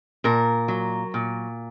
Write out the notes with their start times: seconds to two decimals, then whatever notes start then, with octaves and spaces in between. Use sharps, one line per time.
0.24 A#2 A#4
0.68 F#3
1.14 A#2